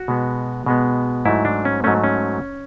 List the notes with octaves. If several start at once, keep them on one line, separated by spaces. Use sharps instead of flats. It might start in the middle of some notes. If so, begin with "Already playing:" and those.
Already playing: F#4
B2 G#3 B3
B2 G#3 B3
G#2 F#3 A3 E4
D4
C#4
G#2 F#3 A3 C#4
C#4